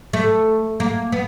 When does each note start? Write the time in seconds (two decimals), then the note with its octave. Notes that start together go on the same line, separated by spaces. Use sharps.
0.13 A3
0.80 A#3
1.12 B3